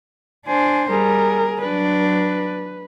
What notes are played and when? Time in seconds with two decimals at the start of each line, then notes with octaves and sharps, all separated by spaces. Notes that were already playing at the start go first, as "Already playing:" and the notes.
0.47 D4 C5 G#5
0.90 G3 G#4 A#4
1.61 F#3 D4 B4